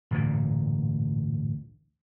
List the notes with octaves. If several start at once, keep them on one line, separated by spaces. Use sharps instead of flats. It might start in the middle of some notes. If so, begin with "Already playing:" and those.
A1 D2 G2 A#2